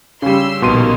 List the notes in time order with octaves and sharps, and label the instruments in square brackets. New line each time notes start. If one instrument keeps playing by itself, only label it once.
[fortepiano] C#3 G3 [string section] C6 E6
[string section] A#1 D#3 A#3 [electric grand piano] B2 C6 D#7